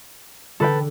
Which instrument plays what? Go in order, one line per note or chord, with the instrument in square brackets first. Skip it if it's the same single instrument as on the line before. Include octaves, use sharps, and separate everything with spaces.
[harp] D3 [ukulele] A4 B4 G5